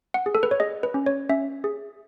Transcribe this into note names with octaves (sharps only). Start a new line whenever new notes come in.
F#5
G#4
A4
B4
C#5
G#4 D#5
B4
C#4
C#5
C#4 E5
G#4